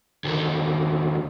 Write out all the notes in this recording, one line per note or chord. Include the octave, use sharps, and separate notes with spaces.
D2 D#3